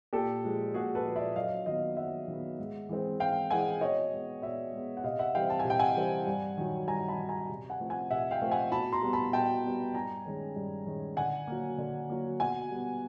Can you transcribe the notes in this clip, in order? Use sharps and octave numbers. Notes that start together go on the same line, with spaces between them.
A#2 G4 A4
F3 G#3
A#2 F#4 G#4
A4 B4
F3 G#3
D5 E5
F#2 D#5 F5
D#3 F#3 B3 D#5 F5
F#2 E5 F#5
D#3 F#3 B3
G#2
E3 G#3 C4
G#2 F5 G5
E3 G#3 C4 F#5 G#5
B2 C#5 D#5
G#3 B3
B2 D5 E5
G#3 B3
F#5
C3 D#5 F5
E5 F#5
E3 G3 C4 F5 G5
A5
G#5
C3
G5
F#5 G#5
E3 G3 C4
G2
D#3 F#3
G2 G#5 A#5
A5 B5
D#3 F#3
G#5 A#5
C3
F#5 G#5
F3 A3 C4
F#5 G#5
C3 E5 F#5
F5 G5
F3 A3 C4
F#5 G#5
B2 A5 B5
A#5 C6
G3 B3
A5 B5
B2 G5 A5
G3 B3
G2 G#5 A#5
D#3 G#3 C#4
G2
D#3 G#3 C#4
D3 F#5 G#5
F#3 A#3
D3
F#3 A#3
B2 F#5 G#5
G3 B3